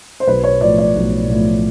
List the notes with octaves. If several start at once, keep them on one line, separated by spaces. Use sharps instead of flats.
C5
B1 B4
C#5
A2 F3 D5
D5
B1
A2 F3